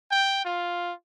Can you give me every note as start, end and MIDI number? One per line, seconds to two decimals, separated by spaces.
0.12 0.43 79
0.45 0.94 65